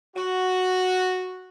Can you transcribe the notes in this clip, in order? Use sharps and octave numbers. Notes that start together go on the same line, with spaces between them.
F#4